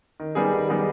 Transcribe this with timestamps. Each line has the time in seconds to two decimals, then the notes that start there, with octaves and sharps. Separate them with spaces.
0.20 D#3
0.35 G3 B3 D#4 G#4
0.53 D#3
0.69 G3 B3 D#4 G#4